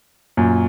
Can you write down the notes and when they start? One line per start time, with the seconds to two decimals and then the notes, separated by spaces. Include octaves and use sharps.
0.37 F#2 A#2